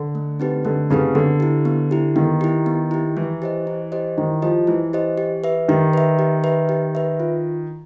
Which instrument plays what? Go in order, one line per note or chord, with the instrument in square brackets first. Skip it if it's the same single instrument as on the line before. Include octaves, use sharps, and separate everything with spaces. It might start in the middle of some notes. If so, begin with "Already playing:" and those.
Already playing: [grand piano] D3
[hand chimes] A3
C4 D#4 G4 B4
[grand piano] D3 [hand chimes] A3
[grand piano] C#3 [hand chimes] C4 D#4 G4 B4
[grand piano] D3 [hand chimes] B3
[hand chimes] E4 G4
B3
E4 G4
[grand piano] D#3 [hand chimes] B3
[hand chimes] E4 G4
B3
E4 G4
[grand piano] E3 [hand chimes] E4
[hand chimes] G4 C5 D#5
E4
G4 C5 D#5
[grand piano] D#3 [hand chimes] E4
[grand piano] F3 [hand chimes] G4 C5 D#5
[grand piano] E3 [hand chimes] E4
[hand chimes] G4 C5 D#5
G4
B4 E5
[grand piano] D#3 [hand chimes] G4
[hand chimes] B4 E5
G4
B4 E5
G4
B4 E5
F4